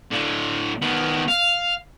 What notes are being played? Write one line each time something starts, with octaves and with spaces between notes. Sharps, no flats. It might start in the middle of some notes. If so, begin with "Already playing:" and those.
A2 D3
D#3 B3
F5